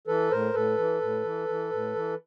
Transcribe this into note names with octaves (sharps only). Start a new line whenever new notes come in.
E3 A4 B4
A2 A#4 C5
A2 A4 B4
E3
A2
E3
E3
A2
E3